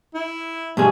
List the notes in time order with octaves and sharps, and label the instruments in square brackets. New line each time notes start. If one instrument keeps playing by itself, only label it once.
[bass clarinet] E4
[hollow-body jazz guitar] G2 B2 G#4